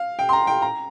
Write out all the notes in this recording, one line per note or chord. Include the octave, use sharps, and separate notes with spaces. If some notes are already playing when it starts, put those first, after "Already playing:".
Already playing: F5
G5
C6
A#5
G5
A#5